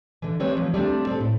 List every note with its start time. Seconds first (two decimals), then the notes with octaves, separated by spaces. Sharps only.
0.22 D3 E3
0.40 G3 A3 C4 B4 C#5
0.56 E3 F3
0.74 G3 A3 C4 D4
1.07 C4 A4
1.20 A2